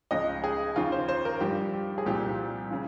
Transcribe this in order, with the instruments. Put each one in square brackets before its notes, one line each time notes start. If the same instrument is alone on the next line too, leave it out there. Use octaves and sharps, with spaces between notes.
[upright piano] C#2 C#3 F3 D#5
G#4
D#2 C#3 F3 F4
C5
C5
A#4
G2 F3 G4
G4
G#4
C2 A#2 F3 G4
C#3 F3